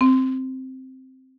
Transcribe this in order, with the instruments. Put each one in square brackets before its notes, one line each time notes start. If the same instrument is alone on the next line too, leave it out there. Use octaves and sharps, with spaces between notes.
[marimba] C4